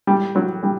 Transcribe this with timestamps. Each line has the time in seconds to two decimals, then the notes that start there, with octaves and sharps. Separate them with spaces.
0.07 A2 G3
0.35 A2 F#3
0.63 A2 G3